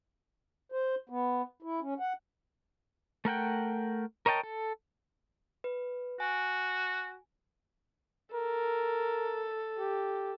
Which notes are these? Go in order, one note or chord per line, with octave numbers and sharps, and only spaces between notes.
C5
B3
E4
C#4
F#5
A3 A#4 F#5 G5
A#4 C#5 D#5 G5 A5
A4
B4
F#4 G#5
A4 A#4
G4